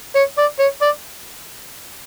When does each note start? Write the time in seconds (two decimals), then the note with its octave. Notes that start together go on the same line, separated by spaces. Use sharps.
0.15 C#5
0.38 D5
0.60 C#5
0.82 D5